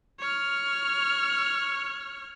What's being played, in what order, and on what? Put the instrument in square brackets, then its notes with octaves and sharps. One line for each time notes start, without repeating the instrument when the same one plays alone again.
[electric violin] C#5 F6